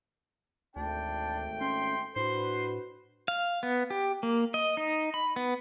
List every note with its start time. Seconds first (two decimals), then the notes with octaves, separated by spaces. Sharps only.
0.76 G#1 D2 A3 D4 G5
1.61 C#4 C6
2.16 A2 D4 F#4 B4 C5
3.28 F5
3.63 B3
3.90 G4
4.23 A#3
4.54 D#5
4.77 D#4
5.14 B5
5.36 B3